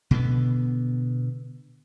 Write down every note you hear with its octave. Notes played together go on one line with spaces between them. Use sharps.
B2 D3 B3